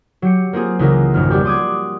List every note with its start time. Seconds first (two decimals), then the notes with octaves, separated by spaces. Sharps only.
0.22 F#3 G4 C#7
0.53 A#3 C4 F4 G#4
0.79 C#2 C#3 E3 F4 F#4 A#4
1.14 G#1 F2 F6
1.30 G3 B3 F#4 G4
1.45 C6 D6 D#6 F#6 G#6